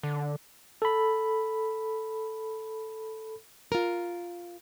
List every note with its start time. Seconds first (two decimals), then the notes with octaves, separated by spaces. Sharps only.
0.03 D3
0.82 A4 B5
3.72 F4 A#4